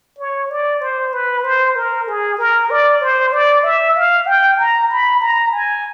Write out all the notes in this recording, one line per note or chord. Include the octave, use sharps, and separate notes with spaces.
C#5
D5
C5
B4
C5
A#4
G#4
A#4
D5
C5
D5
E5
F5
G5
A#5
B5
A#5
G#5